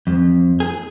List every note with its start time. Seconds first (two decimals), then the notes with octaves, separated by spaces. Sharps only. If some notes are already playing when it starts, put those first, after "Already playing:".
0.07 F2
0.60 G#4